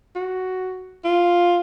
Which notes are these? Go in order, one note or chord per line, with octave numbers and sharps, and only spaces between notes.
F#4
F4